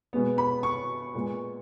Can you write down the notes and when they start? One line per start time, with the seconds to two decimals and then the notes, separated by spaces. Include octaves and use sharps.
0.13 B2 G#3 B3
0.38 B5
0.63 C#6
1.15 A#2 G#3 B3